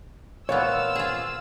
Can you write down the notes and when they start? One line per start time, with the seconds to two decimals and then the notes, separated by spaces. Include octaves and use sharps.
0.49 A#2 E3 B3 C5 C#5 F5 E6
0.95 F4 G#4